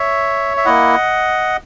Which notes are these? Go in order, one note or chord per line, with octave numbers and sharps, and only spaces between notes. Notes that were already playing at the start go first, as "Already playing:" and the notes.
Already playing: C#5 E5
E5
A#3 E4 D#5 F#5